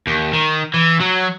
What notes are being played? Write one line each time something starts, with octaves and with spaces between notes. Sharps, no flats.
D#2
D#3
E3
F#3